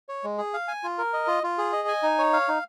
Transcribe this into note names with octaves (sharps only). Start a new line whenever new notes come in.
C#5
G#3
G#4
F5
G#5
F4
A#4
D#5
F4
F4
G#4
D#5
G#5
D#4
C#5
F5
D#4